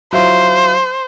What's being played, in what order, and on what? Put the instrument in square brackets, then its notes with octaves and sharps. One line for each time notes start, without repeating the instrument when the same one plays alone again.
[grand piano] F#3 E4 F4 [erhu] C5